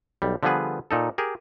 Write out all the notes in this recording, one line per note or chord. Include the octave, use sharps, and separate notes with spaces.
B1 G3
D3 F3 G3 B3 G#4 B4
A#2 D#4 A4
G4 G#4 A#4